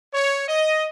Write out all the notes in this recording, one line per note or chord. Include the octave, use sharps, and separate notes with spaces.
C#5
D#5